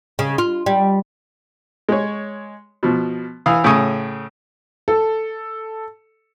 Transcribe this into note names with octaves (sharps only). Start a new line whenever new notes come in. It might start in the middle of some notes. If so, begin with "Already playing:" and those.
C#3
F4
G3
G#3 C#5
B2 F3
E3 F5 D#6
A2 C#3 G#5 C#6 D#6
A4